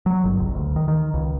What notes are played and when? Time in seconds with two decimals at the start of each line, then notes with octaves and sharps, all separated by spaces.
0.06 F#3
0.24 G1
0.39 C#2
0.55 D2
0.76 D#3
0.88 D#3
1.14 C#2